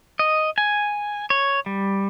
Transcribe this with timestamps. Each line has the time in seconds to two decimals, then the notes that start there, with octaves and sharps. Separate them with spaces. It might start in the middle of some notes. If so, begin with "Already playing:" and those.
0.19 D#5
0.58 G#5
1.30 C#5
1.66 G3